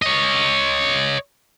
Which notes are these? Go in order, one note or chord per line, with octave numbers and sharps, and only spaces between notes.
C#5 D#5